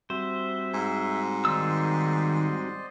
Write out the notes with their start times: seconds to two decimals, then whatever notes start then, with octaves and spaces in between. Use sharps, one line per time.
0.10 G3 C4 F#4 C5 E5
0.74 G#2
1.45 D#3 C5 D5 D#5 E6